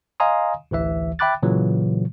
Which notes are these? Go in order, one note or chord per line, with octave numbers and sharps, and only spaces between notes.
D#5 F5 G#5 A#5 C6 D#6
A1 D2 E3 E5
E5 G5 B5 D6 F#6 A6
A#2 C#3 E3 F#3